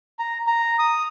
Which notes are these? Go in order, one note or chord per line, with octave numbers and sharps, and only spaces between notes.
A#5
A#5
D#6